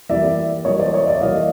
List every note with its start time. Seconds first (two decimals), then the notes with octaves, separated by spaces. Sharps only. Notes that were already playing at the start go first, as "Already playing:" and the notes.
0.09 E3 G3 A#3 D5 E5
0.65 E3 G3 A#3 C#5 D#5
0.79 C5 D5
0.93 C#5 D#5
1.07 D5 E5
1.21 E3 G3 A#3 D#5 F5